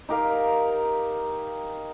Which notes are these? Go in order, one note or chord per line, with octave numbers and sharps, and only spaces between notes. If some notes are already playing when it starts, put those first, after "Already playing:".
D#4 G4 A#4 F5